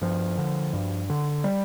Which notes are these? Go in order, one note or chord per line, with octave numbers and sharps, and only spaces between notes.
G2 F3
D3
G2
D3
G3